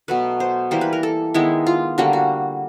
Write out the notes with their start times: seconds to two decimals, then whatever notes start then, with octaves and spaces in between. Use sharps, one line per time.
0.08 B2 F#3 A3 B4
0.40 C5
0.71 E3 G3 A#3 C5
0.81 B4
0.93 A#4
1.03 A4
1.34 D#3 G#3 B3 E4
1.67 F4
1.98 D3 G3 A#3 F#4
2.13 F#4